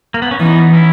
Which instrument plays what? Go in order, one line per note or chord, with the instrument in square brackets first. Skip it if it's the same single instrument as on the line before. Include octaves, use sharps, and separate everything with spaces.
[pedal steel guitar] A#3
B3
C#4
[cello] E3 [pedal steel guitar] B3 D#4
[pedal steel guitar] C#4 E4